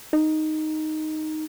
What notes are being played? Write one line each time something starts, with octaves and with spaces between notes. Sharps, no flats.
D#4